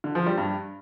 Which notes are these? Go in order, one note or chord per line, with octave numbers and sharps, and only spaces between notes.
D3
F3
G3
G2